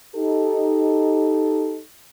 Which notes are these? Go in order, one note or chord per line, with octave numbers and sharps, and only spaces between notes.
D#4 G4 A4